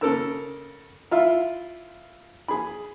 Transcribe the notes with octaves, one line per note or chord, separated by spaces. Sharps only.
C#3 A4 A#4 E6
E4 F4 E5 F5
G#4 B5